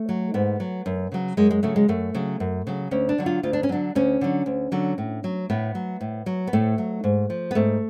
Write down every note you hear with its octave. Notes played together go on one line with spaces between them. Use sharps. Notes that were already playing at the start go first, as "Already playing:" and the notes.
Already playing: A3
F#3
G#2 B3
F#3
F#2
C#3 F#3
F#2 G#3
G#3
C#3 F#3 A3
G#3
F#2 A3
C#3 F#3
F#2
C#3 F#3
D2 C#4
D4
D3 F#3
F4
D2 F4
D4
C#4
D3 F#3 D4
D2 C#4
D3 F#3
D2
D3 F#3
A2
F#3
A2 B3
F#3
A2
F#3
B3
A2 A3
F#3
G#2
F3
B3
G#2 A3